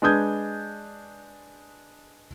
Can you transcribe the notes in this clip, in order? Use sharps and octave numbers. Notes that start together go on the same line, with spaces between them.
G#3 D4 B4 D#6 G6 G#6